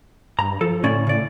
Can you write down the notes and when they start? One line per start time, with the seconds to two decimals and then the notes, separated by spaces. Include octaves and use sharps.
0.39 G2 A#5
0.61 F3 A4
0.83 D2 A2 C#4 D5
1.07 C#3 D5